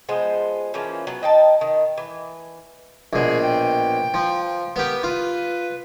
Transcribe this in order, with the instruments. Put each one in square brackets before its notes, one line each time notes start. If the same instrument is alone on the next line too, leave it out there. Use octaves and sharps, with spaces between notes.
[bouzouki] F3 G#3 B3 C5
E3 F3 A#3 C#4
F#3 B3
D#4 G5 A5
D#3
E3
[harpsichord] A#1 B2 [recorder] G#4
[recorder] G5
[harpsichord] F3
[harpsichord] B3 G4 [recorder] A#4
[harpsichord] F4 [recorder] B4